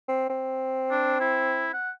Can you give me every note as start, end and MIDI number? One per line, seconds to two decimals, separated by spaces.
0.08 0.26 60
0.30 1.74 60
0.91 1.15 62
1.20 1.72 64
1.74 1.90 78